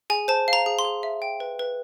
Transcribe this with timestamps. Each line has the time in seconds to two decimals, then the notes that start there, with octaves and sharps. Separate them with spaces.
0.10 G#4 G#5
0.28 C5 A5
0.48 F5
0.53 A#5
0.66 G#4
0.79 C6
0.85 G#4
1.03 E5
1.22 G5
1.40 B4
1.59 B4